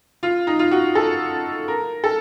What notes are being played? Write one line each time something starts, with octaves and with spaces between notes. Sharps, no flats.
F4
D#4
F4
F#4
A4
A#4
A4